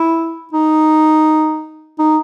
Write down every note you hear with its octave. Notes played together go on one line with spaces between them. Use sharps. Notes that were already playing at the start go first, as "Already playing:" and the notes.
Already playing: E4
D#4
D#4